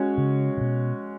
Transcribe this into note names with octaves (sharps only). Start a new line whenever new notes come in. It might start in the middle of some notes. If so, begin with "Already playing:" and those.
Already playing: G#3 C#4 F#4 C#5
C#3
C#3
B2